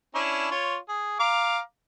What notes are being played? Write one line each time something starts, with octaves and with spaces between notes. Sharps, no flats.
C#4 D4 E4
F4 C#5
G#4
F5 A#5 D6